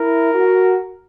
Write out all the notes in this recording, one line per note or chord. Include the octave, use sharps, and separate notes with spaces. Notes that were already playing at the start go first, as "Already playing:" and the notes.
Already playing: E4 A#4
F#4